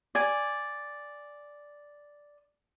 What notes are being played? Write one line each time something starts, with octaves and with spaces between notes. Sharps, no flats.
D5 G#5